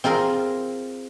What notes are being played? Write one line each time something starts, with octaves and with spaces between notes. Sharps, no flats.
C4 F4 G#4 A#4